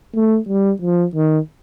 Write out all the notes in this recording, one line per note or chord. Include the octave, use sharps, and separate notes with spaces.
A3
G3
F3
D#3